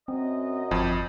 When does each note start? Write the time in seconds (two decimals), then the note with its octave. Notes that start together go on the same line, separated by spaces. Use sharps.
0.08 F#2 C4 D#5
0.71 G1 F2